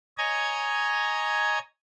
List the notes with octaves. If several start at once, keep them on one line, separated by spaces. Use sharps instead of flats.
C#5 D#5 G#5 A#5 G#6